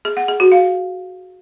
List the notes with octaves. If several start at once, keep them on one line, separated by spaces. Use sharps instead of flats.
G#4
F#5
G#4
F#4
F5